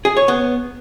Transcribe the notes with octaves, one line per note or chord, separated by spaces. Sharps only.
G#4
C#5
B3